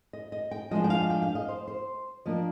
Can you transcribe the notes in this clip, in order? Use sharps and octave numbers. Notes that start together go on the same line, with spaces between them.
D#5
D#5
G5
F3 G#3 D4 D#5
G5
F5
G5
F5
D#5
C5
C5
F3 A#3 D4 D#5